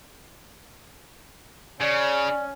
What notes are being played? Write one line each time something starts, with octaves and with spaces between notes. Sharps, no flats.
C#3 C#4 D5